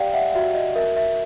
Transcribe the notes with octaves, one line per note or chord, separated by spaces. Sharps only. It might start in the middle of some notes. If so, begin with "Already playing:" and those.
Already playing: G4 D5 F5 G5
E5 F#5
F#4 E5
D#5
A#4 E5
E5